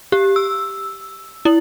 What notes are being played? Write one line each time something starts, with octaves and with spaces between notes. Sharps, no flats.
G4
E6
E4